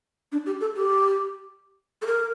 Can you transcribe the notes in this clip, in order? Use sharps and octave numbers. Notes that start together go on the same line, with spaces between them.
D4
G4
A4
G4
A4
A#4